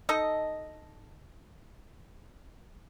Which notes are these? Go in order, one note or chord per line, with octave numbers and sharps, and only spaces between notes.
D#4 A4 D#5